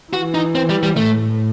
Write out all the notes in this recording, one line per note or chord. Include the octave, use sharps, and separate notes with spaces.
E3 F#4
D#4
C4
G3
G3
A2 A3